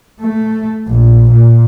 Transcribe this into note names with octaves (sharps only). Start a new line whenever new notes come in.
A3
A#1
A#2